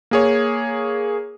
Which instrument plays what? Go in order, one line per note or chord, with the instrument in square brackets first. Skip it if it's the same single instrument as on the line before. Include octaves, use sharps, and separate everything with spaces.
[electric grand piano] A#3 G#4 C#5